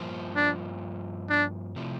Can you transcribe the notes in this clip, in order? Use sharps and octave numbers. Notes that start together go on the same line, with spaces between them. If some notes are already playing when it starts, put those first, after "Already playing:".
Already playing: G2 F3 A#3 F4 C5
D4
D4
C3 F3 A3 E4